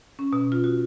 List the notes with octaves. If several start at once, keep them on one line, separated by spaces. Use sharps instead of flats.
C#4
B2
F4
F#4